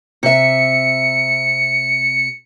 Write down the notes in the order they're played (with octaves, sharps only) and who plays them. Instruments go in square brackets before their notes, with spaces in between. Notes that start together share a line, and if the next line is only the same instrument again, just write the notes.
[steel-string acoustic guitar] C3 E5 [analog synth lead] C#7